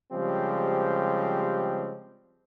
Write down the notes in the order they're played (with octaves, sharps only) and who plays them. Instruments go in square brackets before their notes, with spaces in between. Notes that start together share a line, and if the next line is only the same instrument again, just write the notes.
[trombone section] C#3 F3 G3 G#3 C4 G4